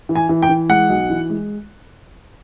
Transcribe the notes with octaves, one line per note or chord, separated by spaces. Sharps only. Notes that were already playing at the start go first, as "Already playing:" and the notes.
E3
G#5
E3
G5
E3
G#3 F#5
B1
E3
G#3